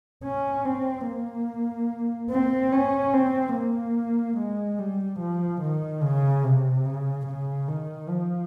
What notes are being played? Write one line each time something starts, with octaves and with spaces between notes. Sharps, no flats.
C#4
C4
A#3
C4
C#4
C4
A#3
G#3
G3
F3
D#3
C#3
C3
C#3
C#3
D#3
F3